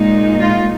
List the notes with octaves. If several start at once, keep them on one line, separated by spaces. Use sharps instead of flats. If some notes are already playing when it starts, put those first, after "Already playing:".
Already playing: A#2 G#3 D#4
F4